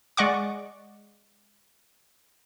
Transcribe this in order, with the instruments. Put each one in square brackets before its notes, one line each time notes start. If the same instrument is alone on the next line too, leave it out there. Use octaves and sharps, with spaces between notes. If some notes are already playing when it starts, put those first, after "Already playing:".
[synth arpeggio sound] G#3 D5 D#5 F#5 C#6 D6